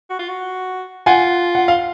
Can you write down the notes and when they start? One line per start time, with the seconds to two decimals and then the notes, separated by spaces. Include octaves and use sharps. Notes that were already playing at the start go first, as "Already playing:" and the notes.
0.10 F#4
0.19 F4
0.29 F#4
1.06 F4 F#5 G#5
1.55 F#5
1.68 F5